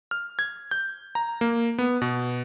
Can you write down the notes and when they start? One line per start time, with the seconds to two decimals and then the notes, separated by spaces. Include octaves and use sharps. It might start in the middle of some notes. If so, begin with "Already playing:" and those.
0.11 F6
0.39 G#6
0.71 G6
1.15 A#5
1.41 A#3
1.78 B3
2.02 B2